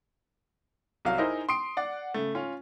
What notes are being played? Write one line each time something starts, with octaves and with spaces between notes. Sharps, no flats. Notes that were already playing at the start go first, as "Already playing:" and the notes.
C2 F#3 F5
D#4 E4 G#4 A#4 C5 D#5
C6 D#6 C7 D7
D5 F#5
C#3 A3
C#4 F4